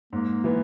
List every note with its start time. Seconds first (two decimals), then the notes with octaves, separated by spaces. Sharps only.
0.13 G#2 A#3
0.44 E3 B3